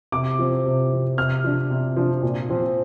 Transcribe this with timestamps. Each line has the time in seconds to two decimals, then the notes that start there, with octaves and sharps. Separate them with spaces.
0.12 C3 D6
0.39 F3 C4
0.65 C3
0.91 F3 C4
1.17 C3 F6
1.44 F3 D4
1.70 C3
1.96 F3 D4
2.22 A#2
2.50 F3 C4